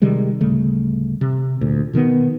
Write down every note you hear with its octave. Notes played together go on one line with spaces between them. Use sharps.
C3 D#3 G3 G#3
D1 C#3 G3 A3
C3
D2 A#2
B2 D#3 G#3 B3